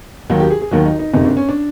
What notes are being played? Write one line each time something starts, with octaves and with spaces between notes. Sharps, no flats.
D#2 D#3 F#3 F#4
G4
G#4
G#4
D#2 D#3 F#3 F#4
D#4
D#4
F#1 F2 C3 D#4
D4
C#4
D4